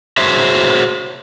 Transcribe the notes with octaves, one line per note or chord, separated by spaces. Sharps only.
F#4 G#4 C5 C#5 E5